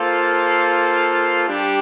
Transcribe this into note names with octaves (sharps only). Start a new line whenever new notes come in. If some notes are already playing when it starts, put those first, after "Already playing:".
Already playing: A#3 F4 A4 C5 F5
G3 D4 G4